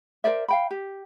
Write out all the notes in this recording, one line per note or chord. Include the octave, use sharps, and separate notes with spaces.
A#4 C5 D5 E5
F5 G5 B5
G4